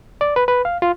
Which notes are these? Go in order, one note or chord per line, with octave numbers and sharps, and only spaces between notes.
D5
B4
B4
F5
F4